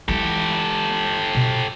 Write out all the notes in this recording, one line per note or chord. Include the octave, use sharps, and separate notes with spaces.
E3 G#3 G4 A4
B2